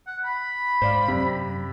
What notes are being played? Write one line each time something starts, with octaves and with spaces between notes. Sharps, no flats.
F#5
B5
G#2 C5 D5 F5
F#2 C3 C4